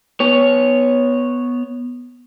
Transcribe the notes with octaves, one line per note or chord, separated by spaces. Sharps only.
B3 C#5